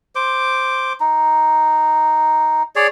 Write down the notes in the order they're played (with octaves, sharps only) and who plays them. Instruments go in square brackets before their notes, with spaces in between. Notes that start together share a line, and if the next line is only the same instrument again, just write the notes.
[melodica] C5 D6
D#4
G#4 C#5 D5